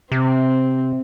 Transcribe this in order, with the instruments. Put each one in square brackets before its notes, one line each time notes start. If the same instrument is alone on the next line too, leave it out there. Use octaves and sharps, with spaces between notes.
[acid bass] C3 [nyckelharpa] C4